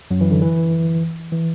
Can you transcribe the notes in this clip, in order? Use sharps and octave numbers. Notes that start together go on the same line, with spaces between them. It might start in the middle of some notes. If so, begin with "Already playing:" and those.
F#2 F#3
E3
D3
E3
E3